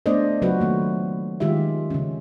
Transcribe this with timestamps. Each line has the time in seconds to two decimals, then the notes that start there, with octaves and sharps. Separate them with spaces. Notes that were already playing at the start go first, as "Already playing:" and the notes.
0.06 A3 B3 D4 C5 D5 D#5
0.42 C#3 F#3 F4 F#4 B4
0.60 D#3 A3 A#3
1.40 D#3 G#3 F4 G4 E5
1.90 C#3 C#4